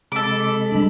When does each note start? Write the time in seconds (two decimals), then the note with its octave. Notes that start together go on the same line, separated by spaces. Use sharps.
0.12 C3 G#3 A4 B5 D6
0.72 G3 D4